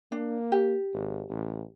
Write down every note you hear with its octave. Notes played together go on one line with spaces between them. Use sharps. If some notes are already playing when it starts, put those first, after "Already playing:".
A#3 D4
G4
G#1
A1